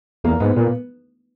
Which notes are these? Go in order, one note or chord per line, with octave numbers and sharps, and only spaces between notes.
E2 A#3
G#2 B3
A#2 B3